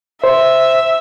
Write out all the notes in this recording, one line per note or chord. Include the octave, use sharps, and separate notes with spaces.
C5 E5